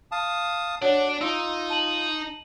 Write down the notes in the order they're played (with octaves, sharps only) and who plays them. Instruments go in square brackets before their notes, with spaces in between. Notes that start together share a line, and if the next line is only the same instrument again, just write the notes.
[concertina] F5 A5 D#6
[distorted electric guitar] D4 [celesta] F#4 C#5 D5 [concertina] F#5
[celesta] D7
[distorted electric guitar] D#4 [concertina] F4 [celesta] E6
[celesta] A5 D#7 F#7